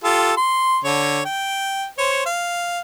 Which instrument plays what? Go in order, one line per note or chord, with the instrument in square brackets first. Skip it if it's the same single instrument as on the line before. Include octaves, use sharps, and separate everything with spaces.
[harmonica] F4 G4 A4
C6
D3 C#5
G5
C5 C#5
F5